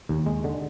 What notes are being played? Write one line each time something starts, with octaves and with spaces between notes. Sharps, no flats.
D#2
G#3
D3